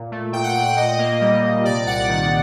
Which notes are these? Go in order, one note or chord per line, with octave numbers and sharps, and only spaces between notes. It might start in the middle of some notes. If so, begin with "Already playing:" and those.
Already playing: A#2
A3
A#2 G5
F#5
A#2 F#5
F#5
A#2 D#5
A#3
G3
A#2
C3 D5
C2 F#5
D#3